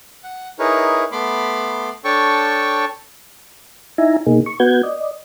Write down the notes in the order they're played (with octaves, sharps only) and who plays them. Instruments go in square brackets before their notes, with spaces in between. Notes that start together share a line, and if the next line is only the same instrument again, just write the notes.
[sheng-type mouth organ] F#5
D#4 E4 G#4 A#4 B4 C#5
A3 B3 B5 C6 D6
D4 A4 C#5 G5 A5 C#6
[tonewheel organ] D#4 E4 E5 G#5 A#5
B2 A#3 D#4 G#4
C#6
B3 F#4 B4 F#5 G6 G#6
D5 D#5